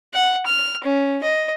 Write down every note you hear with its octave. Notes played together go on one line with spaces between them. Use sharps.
F#5
F6
C#4
D#5